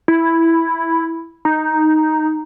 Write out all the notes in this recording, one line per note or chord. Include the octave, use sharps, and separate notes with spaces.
E4
D#4